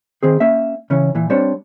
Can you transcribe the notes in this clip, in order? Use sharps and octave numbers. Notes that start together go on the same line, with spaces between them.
D#3 C4 G#4
A#3 C#4 E5
C#3 E3 C#4
A#2 E3
G3 C4 D4 C#5